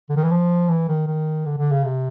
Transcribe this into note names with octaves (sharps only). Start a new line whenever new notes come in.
D3
D#3
E3
F3
E3
D#3
D#3
D3
D3
C#3
C3